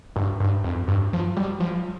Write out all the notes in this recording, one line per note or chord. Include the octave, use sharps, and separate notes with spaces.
G2
G2
F2
G2
F3
G3
F3